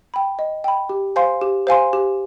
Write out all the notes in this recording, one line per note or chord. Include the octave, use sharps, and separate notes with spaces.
G5 B5
D#5
G5 B5
G4
C5 F5 G#5 C6
G4
C5 F5 G#5 C6
G4